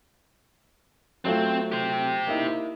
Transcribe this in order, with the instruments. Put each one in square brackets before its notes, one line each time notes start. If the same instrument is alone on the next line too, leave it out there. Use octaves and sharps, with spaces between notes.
[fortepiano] F#3 A3 F4 [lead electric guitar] C4
[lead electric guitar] G4 C5
[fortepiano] A#3 D#4 E4